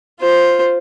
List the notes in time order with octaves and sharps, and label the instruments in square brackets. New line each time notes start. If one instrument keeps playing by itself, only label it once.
[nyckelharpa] F4 C5